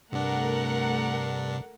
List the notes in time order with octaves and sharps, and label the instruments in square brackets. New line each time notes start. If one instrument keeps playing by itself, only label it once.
[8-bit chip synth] G2 D4 [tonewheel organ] C3 [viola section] A3 [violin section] A#4 F#5